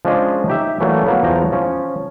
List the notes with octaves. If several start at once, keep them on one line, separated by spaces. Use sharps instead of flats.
F3 G#3 C#4 D4 G#4 D#5
D#4 G4 E5
E3 F#3 G3 A3 A#3 C#4
F#3 A#3 B3
E2 F3 C#5 G5 A5 A#5
F3 C#4